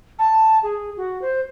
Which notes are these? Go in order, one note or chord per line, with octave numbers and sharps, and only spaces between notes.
A5
G#4
F#4
C5